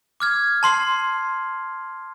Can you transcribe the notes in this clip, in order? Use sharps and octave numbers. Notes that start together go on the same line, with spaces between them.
D6 F6 G#6
A5 C6 C7